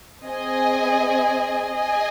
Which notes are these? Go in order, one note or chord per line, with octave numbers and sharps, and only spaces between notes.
C4 G#4 D#5 G#5
G#4 D#5 G#5